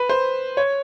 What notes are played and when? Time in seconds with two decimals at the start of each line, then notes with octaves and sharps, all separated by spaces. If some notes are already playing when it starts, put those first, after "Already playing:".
Already playing: B4
0.09 C5
0.57 C#5